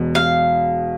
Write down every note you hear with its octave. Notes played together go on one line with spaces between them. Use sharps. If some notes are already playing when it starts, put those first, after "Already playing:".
Already playing: E1 E2 B2
F5